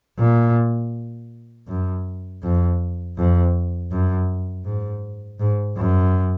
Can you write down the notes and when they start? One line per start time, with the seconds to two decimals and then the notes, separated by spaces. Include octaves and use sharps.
0.19 A#2
1.67 F#2
2.43 F2
3.17 F2
3.91 F#2
4.65 G#2
5.40 G#2
5.77 F#2